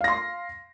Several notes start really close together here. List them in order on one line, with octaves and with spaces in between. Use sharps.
F5 A#6 C6